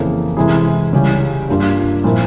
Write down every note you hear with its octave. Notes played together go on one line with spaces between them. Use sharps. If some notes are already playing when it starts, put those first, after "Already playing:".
Already playing: F2 C#3 E3 A#3
C3 E3 G#3 E4 G#4
C#2 C#3 G3 C#4 G4
G2 G3 A#3 F4
A#2 F3 C4 E4 A#4